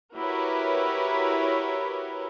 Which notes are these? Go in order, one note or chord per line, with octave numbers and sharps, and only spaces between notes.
E4 F#4 G4 A#4 B4 C#5